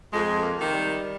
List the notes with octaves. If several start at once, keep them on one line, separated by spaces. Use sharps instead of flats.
F2 G#3
A#3
C3 D#3
G3